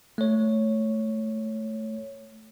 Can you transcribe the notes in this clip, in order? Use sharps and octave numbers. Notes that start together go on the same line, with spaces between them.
A3 C#5